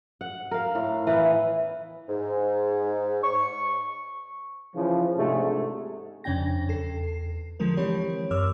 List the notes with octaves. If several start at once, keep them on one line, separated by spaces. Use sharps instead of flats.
F#5
A#4 F5
A2
E3 B3 E4 F5
G#2
C#6
C#3 E3 F3
G#2 C3 G#3 A3 D4
F2 C#3 C#4 D4 G5 A#6
E2 A4 C7
D3 F3 G#3 C4 A#4
E3 C4 G4 C#5
F#2 A#4 C#5 D6 E6 F6